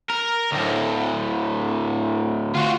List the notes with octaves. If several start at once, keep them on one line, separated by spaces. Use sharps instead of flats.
A#4
D2 A2
F4 F#4